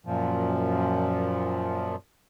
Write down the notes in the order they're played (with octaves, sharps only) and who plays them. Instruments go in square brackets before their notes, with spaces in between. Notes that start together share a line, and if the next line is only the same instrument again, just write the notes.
[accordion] F#2 A#2 F3